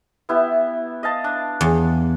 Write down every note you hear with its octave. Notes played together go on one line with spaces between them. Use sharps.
B3 E4 G4
D#5 F5 A5
D4
E2